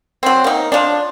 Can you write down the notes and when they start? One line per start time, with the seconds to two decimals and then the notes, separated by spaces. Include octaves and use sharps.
0.23 F#3 C4
0.44 A#3 D#4
0.72 F3 D4